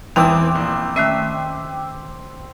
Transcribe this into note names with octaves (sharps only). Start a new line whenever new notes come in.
E2 E3 C4 D#4 G5 D6 E6
A#1
D#3 A3 C#4 E5